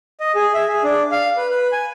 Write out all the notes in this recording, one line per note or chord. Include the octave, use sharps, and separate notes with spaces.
D#5
G#4
E5
G#4
D4
F5
B4
B4
G#5